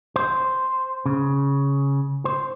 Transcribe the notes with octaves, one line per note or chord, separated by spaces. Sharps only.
C5
C#3
C5